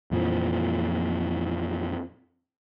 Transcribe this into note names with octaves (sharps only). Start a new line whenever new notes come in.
F2 A#2 E3 F3